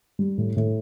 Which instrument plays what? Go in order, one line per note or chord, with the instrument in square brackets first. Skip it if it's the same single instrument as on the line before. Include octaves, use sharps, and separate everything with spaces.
[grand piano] G3
A2
A2